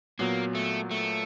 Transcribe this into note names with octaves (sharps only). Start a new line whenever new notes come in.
A#2 F#3 A#3 B3
A3
A3